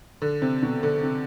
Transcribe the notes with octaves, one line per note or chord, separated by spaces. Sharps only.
D3
C3
B2
D3
C3